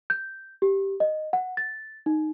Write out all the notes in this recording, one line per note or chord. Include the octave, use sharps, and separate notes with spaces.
G6
G4
D#5
F#5
A6
D#4